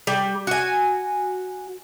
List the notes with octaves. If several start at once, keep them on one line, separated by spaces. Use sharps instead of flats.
G3
F#4 G#5